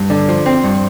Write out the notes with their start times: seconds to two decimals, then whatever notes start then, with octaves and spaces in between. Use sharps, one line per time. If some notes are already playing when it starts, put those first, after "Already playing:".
Already playing: G2
0.10 D3
0.28 F3
0.46 C4
0.64 G2